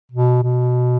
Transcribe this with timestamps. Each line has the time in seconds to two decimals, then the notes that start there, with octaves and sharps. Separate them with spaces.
0.11 B2
0.43 B2